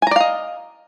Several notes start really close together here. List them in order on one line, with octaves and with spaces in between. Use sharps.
G#5 A#5 D5 F5 D#5